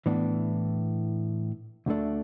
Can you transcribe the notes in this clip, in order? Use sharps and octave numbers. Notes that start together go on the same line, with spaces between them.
A2 E3 B3 D4
D2 D3 A3 D4